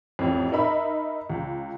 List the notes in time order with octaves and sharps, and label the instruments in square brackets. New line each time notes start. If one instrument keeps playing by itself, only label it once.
[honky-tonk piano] A1 F2
D#4 A#4 E5 B5
C#2